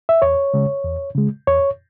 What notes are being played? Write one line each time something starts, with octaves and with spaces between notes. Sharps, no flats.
E5
E2 C#5
C#3 G#3
E2
C#3 G#3
E2 C#5